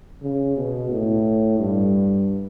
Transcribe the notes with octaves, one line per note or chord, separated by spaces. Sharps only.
C#3
B2
A2
G2